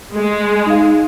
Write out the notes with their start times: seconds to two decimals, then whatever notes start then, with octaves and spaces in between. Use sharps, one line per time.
0.15 G#3
0.66 D#4 F5